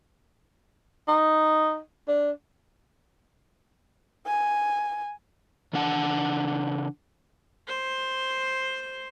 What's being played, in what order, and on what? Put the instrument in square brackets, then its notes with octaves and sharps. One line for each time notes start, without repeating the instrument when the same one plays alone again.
[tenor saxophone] D#4
D4
[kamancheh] G#5
[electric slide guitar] C#3 E3 D4 F#5 G#5 A5
[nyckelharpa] C5 C6